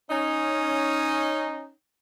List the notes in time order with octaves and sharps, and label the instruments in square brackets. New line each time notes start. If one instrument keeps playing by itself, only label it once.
[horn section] C#4 D#4